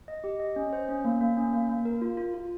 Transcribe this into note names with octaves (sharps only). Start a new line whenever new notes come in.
D#5
G4
D#5
C#4
C5
C#4
A#3
A#3
C#4
A#3
A#3
A#4
F4
F4
F4